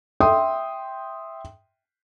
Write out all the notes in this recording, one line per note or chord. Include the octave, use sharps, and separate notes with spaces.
E5 G5 C6 D#6